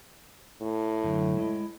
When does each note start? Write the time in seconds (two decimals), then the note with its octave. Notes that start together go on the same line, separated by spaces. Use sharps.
0.62 A2
1.03 F#2 D3
1.37 G#3 E4 D#5